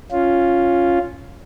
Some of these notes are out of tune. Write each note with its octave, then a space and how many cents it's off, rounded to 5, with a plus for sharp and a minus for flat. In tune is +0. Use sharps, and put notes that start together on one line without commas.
C#4 +0 F4 +0